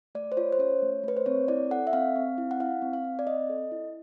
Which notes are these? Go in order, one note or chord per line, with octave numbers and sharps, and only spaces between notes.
A3 D5
C5
F4 C#5
C5
C#4 C#5
A3
A3 B4
C5
C4 C#5
E4 D5
A4 F#5
E5
C4 F5
C4
E4
F#5
E4 F5
C4
F5
C4
D5
C4 D#5
A4
E4